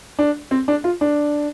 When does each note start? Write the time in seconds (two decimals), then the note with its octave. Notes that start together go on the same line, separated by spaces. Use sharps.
0.19 D4
0.51 C4
0.68 D4
0.84 F4
1.01 D4